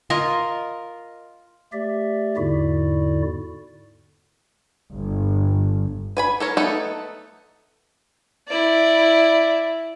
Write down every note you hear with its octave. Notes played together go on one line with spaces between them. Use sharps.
F4 A#4 D#5
A3 G4 D5 E5
E2 G#2 D3 E4 F#4 D5
G1
B4 G#5 B5
A4 A#4 C#5
A3 B3 D#4 A4
E4 D5